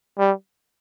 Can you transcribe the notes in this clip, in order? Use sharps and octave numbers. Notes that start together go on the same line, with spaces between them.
G3